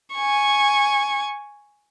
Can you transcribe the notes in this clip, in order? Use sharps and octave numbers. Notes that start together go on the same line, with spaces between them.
G#5 C#6